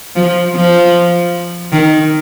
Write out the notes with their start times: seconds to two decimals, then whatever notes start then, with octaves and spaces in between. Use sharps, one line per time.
0.16 F3
0.56 F3
1.72 D#3